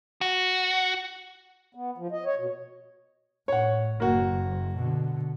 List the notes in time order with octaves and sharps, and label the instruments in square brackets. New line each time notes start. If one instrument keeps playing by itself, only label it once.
[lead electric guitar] F#4
[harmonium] B3
F3
D#5
C#5
B2
[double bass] A2 [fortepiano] C#5 F#5
[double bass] F#1 [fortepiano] A#3 F#4
[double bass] B2 D3